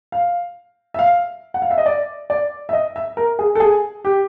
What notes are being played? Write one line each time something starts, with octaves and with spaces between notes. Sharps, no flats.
F5
E5
F5
F#5
F5
E5
D#5
D5
D5
E5
D#5
E5
A#4
G#4
A4
G#4
G4